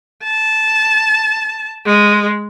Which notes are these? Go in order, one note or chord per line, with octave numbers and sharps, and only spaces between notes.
A5
G#3